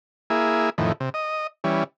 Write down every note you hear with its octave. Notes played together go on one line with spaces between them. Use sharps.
A#3 E4 G#4
F2 A2 D#3 E3
C3
D#5
E3 G3 C#4